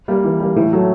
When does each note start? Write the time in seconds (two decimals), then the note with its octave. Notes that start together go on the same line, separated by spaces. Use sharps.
0.08 G3 A#3
0.24 E3
0.40 G3 A#3
0.56 A2 E3
0.73 F#3 A3